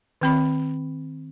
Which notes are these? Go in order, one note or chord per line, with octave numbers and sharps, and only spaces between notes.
D#3 C4 B5